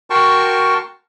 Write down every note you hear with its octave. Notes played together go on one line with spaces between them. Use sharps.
F#4 A#4 G5 A5 C6 C#6